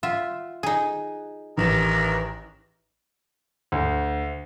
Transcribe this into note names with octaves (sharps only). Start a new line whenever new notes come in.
F4 E5 F#5
D#4 G#4
A1 D#3 G4 E7
D2